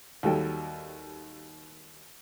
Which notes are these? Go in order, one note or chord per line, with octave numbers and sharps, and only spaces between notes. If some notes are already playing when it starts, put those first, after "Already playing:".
D#2 F#3 G3 A4 G5